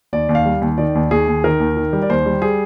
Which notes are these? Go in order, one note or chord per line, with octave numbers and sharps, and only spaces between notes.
D#2 D5
D#2
F5
G3
D#2
D#3 D5
D#2
D#2 G#4
D#2
D#3 A#4
D#2
D#3
G3
D5
D#2 C5
G3
G3 G#4